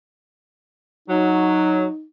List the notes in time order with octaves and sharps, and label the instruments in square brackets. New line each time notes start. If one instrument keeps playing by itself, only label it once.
[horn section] F#3 [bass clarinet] D#4